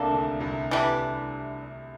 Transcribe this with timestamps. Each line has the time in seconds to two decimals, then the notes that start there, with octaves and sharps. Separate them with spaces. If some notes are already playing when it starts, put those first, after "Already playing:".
Already playing: C2 C3 A#3 D4 A4
0.11 D2 D3
0.40 C2 C3
0.71 E3 G3 D4